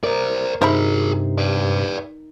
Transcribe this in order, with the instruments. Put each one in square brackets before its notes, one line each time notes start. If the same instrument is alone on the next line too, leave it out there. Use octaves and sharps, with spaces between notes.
[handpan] A#4 [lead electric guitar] C5 D5
[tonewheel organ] G2 C3 [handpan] D#4 [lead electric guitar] G#4 A#4 [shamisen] C5 E5 B5
[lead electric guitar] B4 D5